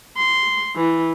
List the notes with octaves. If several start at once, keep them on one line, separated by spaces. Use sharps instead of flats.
C6
E3